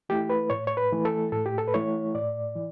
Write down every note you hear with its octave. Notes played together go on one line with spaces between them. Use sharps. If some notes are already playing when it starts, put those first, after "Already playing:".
E3 A3 E4 G4
B4
A2 C#5
C#5
B4
E3 A3 E4
A4
A2 A4
G4
A4
B4
E3 A3 E4 C#5
A2 D5
E3